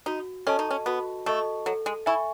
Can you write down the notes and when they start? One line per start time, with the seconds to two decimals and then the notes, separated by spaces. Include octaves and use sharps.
0.06 D#4 F#4
0.47 C#4 A4 D#5 A5 C#6
0.59 D#4
0.71 C#4
0.86 B3 F#4
1.26 A3 A4 D#5 A5 C#6
1.66 F#3 A4
1.86 G#3
2.06 E4 E5 G#5 C#6